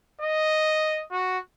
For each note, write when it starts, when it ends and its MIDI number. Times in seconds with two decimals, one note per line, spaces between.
0.21 1.03 75
1.12 1.38 66